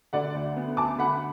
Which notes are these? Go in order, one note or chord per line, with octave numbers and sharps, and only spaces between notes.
D3 D5 F#5
D2
B3
D2 A5 D6
D3 F#5 B5